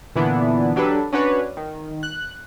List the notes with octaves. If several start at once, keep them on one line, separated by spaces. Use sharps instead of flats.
A#2 D3 E3 B3 D4 E4
F#3 D4 G4 A4 B4
C#4 D4 F#4 B4 C#5
D#3
F#6